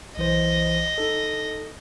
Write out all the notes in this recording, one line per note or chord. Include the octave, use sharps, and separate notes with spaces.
B1 E3 C5 D#5
D#4 A4